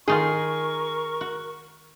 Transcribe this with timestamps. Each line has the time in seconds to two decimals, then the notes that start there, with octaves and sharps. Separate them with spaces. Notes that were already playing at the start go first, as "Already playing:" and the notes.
0.08 D#3 D#4 F4 G#4 A#4 C#6
1.21 F#4